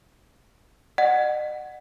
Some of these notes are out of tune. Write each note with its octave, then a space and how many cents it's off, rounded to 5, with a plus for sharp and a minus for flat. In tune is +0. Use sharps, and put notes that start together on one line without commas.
D#5 -45 F#5 +0